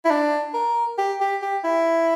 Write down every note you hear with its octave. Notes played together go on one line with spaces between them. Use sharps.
E4
D4
A#4
G4
G4
G4
E4